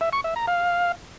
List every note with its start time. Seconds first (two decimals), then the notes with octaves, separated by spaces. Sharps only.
0.01 E5
0.13 C#6
0.24 E5
0.36 A#5
0.48 F5